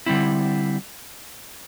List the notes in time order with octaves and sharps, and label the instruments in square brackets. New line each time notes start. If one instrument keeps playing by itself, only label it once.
[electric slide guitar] D3 G3 C4 E4